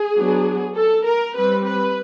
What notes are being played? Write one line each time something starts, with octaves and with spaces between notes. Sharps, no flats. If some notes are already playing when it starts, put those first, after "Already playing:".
Already playing: G#4
F#3 B3 D4
A4
A#4
G3 C4 B4
B4